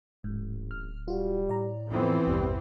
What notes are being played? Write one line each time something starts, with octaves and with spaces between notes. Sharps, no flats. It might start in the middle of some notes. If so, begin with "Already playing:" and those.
D1 A1 G#2
F6
G3 F4 F#4
A2 D5 A#5
F2 E3 B3 C4
A1 E2 G2 B2 G3